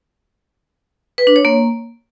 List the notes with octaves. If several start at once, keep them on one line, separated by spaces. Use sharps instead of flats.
B4
D4
C#5
A#3